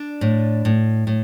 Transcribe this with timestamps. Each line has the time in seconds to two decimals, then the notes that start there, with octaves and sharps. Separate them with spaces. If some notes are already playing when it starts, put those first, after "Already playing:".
Already playing: D4
0.21 A2
0.65 A2
1.07 A2